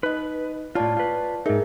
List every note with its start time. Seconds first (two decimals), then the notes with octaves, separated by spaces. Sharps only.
0.03 D#4 B4 D#5
0.75 A2 F4 C#5 D5 A5
0.97 F4 B4
1.46 G#2 D#4 G#4 A#4 E5